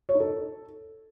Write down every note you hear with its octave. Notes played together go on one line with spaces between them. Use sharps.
C#5
D#4
A4